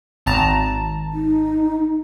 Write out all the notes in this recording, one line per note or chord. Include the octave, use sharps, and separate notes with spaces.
G#1 A5 A#5
D#4